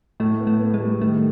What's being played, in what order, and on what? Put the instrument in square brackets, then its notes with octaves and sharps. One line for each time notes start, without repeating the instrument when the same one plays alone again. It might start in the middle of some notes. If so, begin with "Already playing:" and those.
[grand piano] A2 [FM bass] A3
[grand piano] B3
[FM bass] A3
[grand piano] B3
[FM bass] G#3
[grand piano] G3
[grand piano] D#3 [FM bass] A3